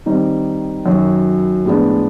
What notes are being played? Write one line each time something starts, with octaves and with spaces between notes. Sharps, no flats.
D#3 G3 C4 D#4
F#2 D#3 F#3
A2 F3 G#3 B3 D4